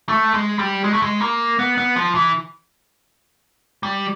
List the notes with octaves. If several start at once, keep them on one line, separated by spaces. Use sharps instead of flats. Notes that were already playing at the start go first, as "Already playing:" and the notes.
A3
G#3
G3
G#3
A3
G#3
A#3
B3
B3
F3
E3
G3